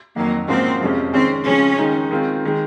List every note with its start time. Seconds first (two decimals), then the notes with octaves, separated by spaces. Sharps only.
0.16 F2 D#3 F#3 A#3
0.48 G#2 F3 A#3 C4 C#4 F#4
0.81 F2 C3 F3 G#3 C#4
1.13 D#3 G#3 C4 C#4
1.46 C#3 F3 G#3 C#4
1.78 D#3 G#3 D#4
2.11 D#3 G#3 C4 F4
2.45 D#3 G#3